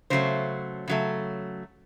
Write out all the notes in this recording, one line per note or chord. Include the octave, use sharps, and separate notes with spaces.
C#3 F#3 A3 C5
C#3 F#3 A3